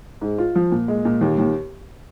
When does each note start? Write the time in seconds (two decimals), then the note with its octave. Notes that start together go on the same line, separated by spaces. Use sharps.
0.21 G#2
0.38 F4
0.55 F3
0.72 A#2
0.88 G#3
1.05 A#2
1.21 D#2
1.38 D#2